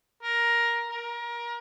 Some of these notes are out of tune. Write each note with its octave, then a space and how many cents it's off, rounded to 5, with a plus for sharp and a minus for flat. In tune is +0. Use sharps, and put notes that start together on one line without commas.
A#4 +10
A#4 +25